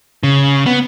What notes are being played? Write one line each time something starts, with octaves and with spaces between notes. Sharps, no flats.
C#3
B3